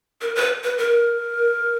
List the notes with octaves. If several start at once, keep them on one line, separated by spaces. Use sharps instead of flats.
A#4
B4
B4
A#4